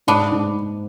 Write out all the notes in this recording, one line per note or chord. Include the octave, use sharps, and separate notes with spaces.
G#2 B3 D4
G#2